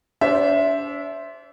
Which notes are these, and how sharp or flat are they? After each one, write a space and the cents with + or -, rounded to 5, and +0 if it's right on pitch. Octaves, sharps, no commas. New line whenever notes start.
D4 -40 C5 +0 E5 +0